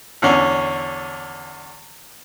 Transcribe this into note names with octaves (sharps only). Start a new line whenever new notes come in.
E2 D3 C#4